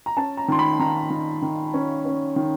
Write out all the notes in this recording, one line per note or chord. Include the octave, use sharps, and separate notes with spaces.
A#5
C#4 A5
A#5
D#3 C6
B5
D#3 A#5
D#3
D#3
C#4
C#4
D#3